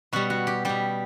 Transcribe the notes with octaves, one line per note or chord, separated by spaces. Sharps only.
B2 G3 F#4
F#4
G4
B2 G3 G4